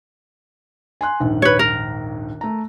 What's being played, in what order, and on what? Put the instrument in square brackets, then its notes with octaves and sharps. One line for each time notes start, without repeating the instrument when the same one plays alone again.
[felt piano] G#5 C6 F#6
A#1 D#2 G#2
[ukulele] B4 C#5
A#4
[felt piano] A3 A#5